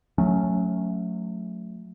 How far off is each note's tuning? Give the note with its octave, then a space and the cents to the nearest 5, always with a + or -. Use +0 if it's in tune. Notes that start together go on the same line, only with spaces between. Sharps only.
F#3 -25 A3 +0 C#4 +0